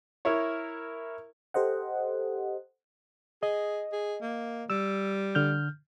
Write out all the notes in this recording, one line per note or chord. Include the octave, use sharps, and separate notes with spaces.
E4 A#4 C#5
G4 A4 C5 D#5 F#5
G#4 D#5
G#4
A#3
G3 E6
D3 F6 G6